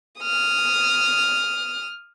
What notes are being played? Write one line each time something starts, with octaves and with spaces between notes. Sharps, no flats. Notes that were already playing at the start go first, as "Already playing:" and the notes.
D#6 F6